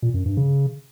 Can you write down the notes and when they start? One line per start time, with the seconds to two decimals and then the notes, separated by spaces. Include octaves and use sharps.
0.03 A#2
0.14 F#2
0.26 G2
0.37 C#3